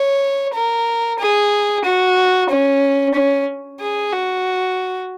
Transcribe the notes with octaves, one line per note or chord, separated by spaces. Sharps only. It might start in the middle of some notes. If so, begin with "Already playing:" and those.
Already playing: C#5
A#4
G#4
F#4
C#4
C#4
G#4
F#4